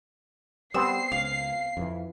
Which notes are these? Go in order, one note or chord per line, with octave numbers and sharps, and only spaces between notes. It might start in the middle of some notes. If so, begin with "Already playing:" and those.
G3 B3 C4 F#5 E6 C7
C#2 F5
F2 E3